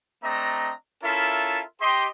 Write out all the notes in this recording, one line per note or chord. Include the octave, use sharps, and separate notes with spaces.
A3 C4 D4 D#5 A#5
C#4 E4 F4 A4 A#4 E5
G4 D#5 C6